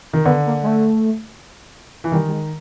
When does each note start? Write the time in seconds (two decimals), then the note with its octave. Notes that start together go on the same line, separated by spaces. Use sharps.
0.13 D#3
0.25 D3 B3
0.46 A#3
0.63 G#3
0.67 A3
2.04 E3
2.12 D#3 G3
2.28 G3
2.32 G#3